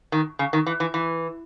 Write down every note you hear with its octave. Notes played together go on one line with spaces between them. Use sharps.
D#3
C#3
D#3
E3
E3
E3